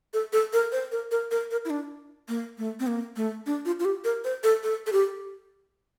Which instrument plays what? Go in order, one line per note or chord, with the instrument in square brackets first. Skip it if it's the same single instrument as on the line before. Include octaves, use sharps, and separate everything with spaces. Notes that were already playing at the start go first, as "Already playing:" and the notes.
[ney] A4
A4
A#4
C5
A#4
A#4
A#4
A#4
E4
D4
A#3
A3
C4
A#3
A3
D4
F4
F4
G4
A#4
C5
A4
A4
A4
G4